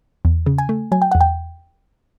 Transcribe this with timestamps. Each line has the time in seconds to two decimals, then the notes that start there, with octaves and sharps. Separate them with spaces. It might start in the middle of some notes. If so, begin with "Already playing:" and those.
0.25 E2
0.46 C#3
0.58 G#5
0.69 A3
0.92 F#3 G#5
1.02 G5
1.11 E2 F#5
1.21 G5